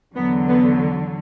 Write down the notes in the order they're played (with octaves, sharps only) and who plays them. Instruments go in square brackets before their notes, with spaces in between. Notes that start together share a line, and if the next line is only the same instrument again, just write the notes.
[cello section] E2 D3 F#3 B3
B3